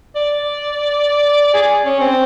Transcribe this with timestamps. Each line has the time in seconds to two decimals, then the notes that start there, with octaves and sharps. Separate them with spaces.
0.16 D5
1.54 G#4
1.86 C#4
2.00 C4